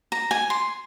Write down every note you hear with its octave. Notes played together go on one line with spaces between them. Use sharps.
A#5
G#5
C6